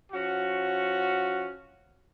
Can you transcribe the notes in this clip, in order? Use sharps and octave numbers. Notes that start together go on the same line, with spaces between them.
F3 C#4 F#4